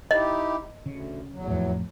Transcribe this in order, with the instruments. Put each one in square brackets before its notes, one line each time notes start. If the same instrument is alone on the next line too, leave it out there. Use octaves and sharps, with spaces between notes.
[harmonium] D#4 E4 G4 [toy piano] D#5
[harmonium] D2 [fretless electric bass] C#3
[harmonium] E2 F#3
[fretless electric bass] F2 A2